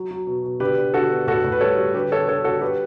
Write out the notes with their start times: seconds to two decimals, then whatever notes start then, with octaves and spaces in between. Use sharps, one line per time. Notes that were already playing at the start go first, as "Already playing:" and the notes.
Already playing: F#3
0.11 F#3
0.27 B2
0.44 B2
0.60 D3 G4 B4
0.78 D3
0.94 D3 F#4 A4
1.11 B3
1.27 A2 F#4 A4
1.44 A2
1.52 B4
1.61 G3 A4 C#5
1.78 G3
1.94 D3 G4 B4
2.12 D3 A4 C#5
2.28 D3 A4 C#5
2.44 D3 F#4 A4
2.61 G3 G4 B4